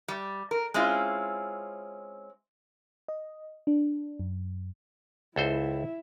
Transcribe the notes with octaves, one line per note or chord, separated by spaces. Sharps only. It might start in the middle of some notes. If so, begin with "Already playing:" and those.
G3
A#4
G#3 C4 C#4 E4 F4
D#5
D4
F#2
C#2 E4 A4 C5 E5